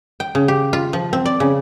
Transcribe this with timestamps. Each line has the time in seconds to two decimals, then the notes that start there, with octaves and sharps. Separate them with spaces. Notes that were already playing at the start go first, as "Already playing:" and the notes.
0.20 G5
0.35 C#3
0.48 G4
0.73 F4
0.93 F3
1.13 C4
1.26 D5
1.40 C#3